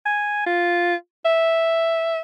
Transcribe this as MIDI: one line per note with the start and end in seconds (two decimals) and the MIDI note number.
0.06 0.44 80
0.46 0.95 65
1.25 2.21 76